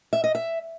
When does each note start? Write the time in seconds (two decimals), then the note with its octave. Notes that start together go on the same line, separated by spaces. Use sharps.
0.13 E5
0.24 D#5
0.35 E5